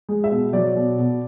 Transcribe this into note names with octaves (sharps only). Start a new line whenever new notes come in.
G#3
E5
B2
F#3 D5
B2
B2